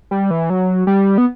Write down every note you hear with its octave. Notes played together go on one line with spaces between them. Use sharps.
G3
E3
F#3
G3
B3